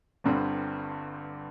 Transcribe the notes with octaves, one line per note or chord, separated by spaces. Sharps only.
G1 G2 D3 G3 C4